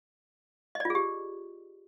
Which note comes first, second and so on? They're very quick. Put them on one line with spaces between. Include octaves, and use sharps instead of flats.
D#5 D5 F4 G#4 G4